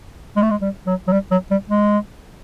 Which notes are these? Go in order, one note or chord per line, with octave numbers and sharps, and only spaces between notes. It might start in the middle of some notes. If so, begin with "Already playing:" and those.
G#3
A3
G#3
G3
F#3
F#3
G3
F#3
G3
G#3